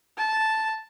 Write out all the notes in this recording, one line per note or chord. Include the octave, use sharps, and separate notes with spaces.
A5